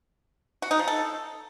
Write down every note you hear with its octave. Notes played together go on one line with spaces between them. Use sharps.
F#4
D#4
F3
A4